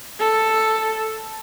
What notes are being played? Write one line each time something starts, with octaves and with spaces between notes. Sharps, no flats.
A4